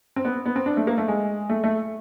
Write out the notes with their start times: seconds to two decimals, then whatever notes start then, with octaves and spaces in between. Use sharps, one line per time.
0.16 C4
0.25 B3
0.46 B3
0.56 C4
0.66 D4
0.77 A3
0.87 A#3
0.98 A3
1.08 G#3
1.49 A3
1.63 A3